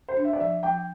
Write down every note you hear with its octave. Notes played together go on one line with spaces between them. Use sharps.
C5
D4
E5
D5
F3 E5
F3 G5